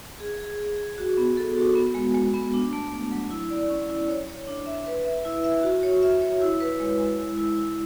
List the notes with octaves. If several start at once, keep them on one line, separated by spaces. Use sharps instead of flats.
G#4
G#4
G#4
G#4
F#4
B3
A4
F#4
B3
G#3
G#3
B3
D4
A3
A3
F#3
E4
D5
C#4
E4
C#5
C#5
D4
E5
B4
E5
E4
E5
F#4
C#5
E5
C#5
E4
B4
G#3
G#3
E4
E4
E4